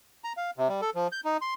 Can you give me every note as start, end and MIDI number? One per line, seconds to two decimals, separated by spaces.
0.24 0.33 82
0.37 0.51 77
0.57 0.68 48
0.69 0.81 55
0.82 0.90 69
0.95 1.07 53
1.12 1.21 91
1.25 1.37 63
1.41 1.54 84